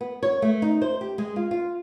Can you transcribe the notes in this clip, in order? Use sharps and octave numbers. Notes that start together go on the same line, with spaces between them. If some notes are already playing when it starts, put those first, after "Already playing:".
B3
C#5
A3
D#4
C5
G4
G#3
F4
F4